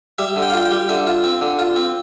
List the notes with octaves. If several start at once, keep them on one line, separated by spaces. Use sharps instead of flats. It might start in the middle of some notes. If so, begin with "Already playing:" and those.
G3 E5
D3
G5
F5
F4 G5
G5
G3
D3 E5
F4
C4
D3
F4
C4